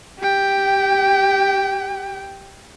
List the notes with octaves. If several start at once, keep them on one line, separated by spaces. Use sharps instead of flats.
G4 G5